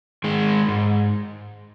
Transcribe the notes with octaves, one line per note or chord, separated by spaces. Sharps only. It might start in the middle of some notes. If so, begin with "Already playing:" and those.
D#3 G#3
G#2